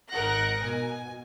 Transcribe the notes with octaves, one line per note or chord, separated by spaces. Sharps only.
G#1 D#4 A#4 F#5 F#6 A#6
B2 G#5